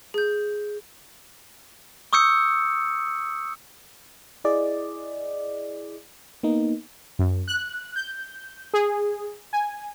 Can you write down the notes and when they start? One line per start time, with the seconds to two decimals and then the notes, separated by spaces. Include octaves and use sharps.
0.14 G#4 G6
2.13 C#6 D#6 E6 G6 C#7
4.44 E4 G#4 D5 D#5
6.43 A#3 B3 D#4
7.19 F#2
7.48 F#6
7.96 G6
8.74 G#4
9.53 G#5